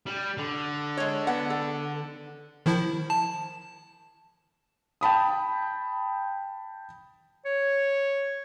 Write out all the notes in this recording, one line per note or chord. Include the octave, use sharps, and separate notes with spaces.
G3
D3
G#3 C#5
B3 F#5
A4
D#3 F3 E4
A5
G5 A5 B5 D#6
C#5